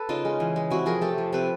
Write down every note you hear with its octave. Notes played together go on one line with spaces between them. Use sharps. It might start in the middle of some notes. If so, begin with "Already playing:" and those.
Already playing: A4 B4
C#3 D#4 F4
G#3
E3
G#3
C3 E4 F#4
F3 G#4 A#4
A3 G4 A4
F3
C3 A4 B4